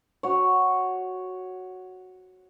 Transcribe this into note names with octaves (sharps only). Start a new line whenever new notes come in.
F#4 C#5